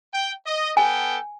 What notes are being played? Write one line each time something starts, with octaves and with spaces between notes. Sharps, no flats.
G5
D#5
B3 A4 G5 G#5